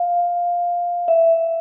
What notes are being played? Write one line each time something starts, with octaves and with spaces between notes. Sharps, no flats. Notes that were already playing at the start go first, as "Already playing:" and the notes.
Already playing: F5
E5